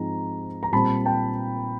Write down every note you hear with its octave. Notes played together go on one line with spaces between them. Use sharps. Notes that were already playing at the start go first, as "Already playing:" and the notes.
Already playing: G#2 F3 G#3 C4 A#5
A#5
A#2 G3 C4 A5 B5
G5 A5